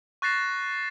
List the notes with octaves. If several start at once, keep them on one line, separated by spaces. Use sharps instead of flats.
C#6 F#6 A6 A#6 C7 E7